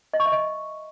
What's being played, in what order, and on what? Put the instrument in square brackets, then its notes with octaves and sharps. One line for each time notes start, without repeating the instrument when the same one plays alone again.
[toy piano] D#5
C#6
E5
D#5